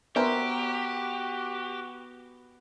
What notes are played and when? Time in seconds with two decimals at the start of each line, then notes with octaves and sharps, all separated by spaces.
0.16 B3 F#4 G4 A#4 C5 E5